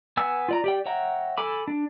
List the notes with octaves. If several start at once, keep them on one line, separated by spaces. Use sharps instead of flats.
B3 G#5 E6
F4 D5 A#5
G4 D5 G5
C#5 E5 F#5 G5 A#5
A4 G#5 B5 D6
D4